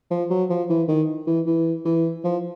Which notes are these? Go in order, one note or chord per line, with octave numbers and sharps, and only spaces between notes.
F3
F#3
F3
E3
D#3
E3
E3
E3
F3